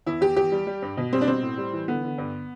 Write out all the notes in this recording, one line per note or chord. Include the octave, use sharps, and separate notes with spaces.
E2 E4
E2 G4
E2 G4
G3
G3
G2
B2
G3 C4
D4
B2 C4
A2
G3
E3
D3 B3
D3
G2